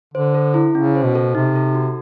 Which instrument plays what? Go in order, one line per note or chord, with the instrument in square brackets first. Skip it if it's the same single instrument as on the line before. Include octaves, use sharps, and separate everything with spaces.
[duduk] D3 [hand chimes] C5
[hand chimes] A4
E4
[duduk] C#3 [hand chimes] C#4
[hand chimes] C5
[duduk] B2
[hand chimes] A4
[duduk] C3 [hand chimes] D#4
[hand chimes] A4
F#4